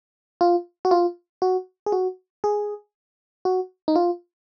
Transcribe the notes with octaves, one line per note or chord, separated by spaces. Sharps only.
F4
F#4
F4
F#4
G#4
F#4
G#4
F#4
D#4
F4